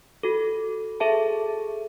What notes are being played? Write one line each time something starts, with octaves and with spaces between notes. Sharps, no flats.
F#4 A4
G#4 A4 E5 A5